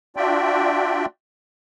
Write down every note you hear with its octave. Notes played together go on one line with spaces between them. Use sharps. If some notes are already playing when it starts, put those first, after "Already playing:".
D4 F4 F#4 D5 E5 G5